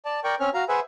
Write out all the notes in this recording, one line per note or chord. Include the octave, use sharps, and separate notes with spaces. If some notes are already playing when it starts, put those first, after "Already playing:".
D5 A5
A#4 D5 G5 C#6
C4 C#4 C#5 G#5 F6
F#4 F5 A#5
G#4 B4 C5 E5 F#5 G#5